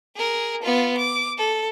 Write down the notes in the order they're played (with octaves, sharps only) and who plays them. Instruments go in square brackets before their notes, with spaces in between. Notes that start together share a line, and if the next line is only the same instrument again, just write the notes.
[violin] G#4 A#4
B3 F4
D6
A4